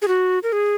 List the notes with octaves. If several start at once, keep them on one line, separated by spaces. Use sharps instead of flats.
G#4
F#4
A#4
G#4